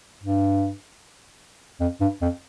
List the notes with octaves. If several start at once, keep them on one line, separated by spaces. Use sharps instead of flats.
G2
F2
G2
F2